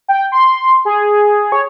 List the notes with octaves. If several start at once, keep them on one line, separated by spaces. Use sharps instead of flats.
G5
C6
G#4
C#5